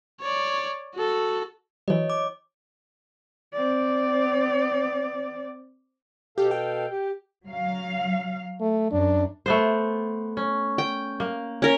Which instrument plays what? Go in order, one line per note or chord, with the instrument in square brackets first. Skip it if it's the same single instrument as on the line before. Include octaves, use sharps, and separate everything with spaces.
[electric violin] C#5 D5
F#4 A4
[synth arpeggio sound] E3 F#3 [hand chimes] C#5 D#5
[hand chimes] D6
[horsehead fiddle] C4 D5
[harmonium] B2 A4 F5 [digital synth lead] G4
[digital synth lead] G5
[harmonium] G4
[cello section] F#3 F5
[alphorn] A3
[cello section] F#2 [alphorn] D4
[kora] A3 B3 C5
C#4
[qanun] G5
[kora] A#3
[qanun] C#4 A#4